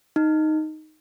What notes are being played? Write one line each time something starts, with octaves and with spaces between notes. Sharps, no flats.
D#4